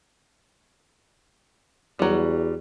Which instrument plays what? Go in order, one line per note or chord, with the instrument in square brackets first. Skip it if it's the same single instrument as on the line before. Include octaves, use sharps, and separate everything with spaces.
[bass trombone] E2 [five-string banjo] F#3 G3